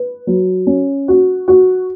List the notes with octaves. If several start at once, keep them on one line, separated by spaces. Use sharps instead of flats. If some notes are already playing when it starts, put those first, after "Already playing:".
Already playing: B4
F#3
C#4
F#4
F#4